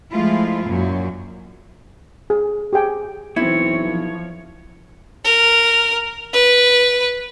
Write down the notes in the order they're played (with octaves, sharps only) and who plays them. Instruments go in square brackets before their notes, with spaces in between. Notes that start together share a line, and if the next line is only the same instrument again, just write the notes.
[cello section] F3 G#3 A3 E4 F4
F#2 A#2 F#3
[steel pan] G#4
G4 G#4 G5 G#5
[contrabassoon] B1 [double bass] E3 C4 [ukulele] E4 [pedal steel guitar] C#5
[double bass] F3
[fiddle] A#4
B4